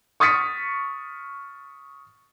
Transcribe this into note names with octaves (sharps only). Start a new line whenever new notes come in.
C#6 D#6 F6 A6 B6 C#7